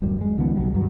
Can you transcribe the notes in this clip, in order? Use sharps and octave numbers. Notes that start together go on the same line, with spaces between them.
D1 A1 F#2 G3
G#3
C#2 D#3 F3 B3
B1 F#3 G3
G2 F#3